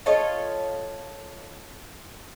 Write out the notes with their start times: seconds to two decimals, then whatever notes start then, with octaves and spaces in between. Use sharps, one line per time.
0.06 F4 A4 C#5 D#5